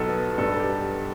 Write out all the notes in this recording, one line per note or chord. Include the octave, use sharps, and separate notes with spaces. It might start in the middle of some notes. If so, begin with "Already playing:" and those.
Already playing: B1 B2 A4
B3
G2 A4
A4
G4